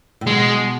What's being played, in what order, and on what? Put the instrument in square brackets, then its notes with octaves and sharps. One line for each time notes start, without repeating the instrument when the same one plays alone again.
[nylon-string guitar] A2
[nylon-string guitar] B2 [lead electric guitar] G#3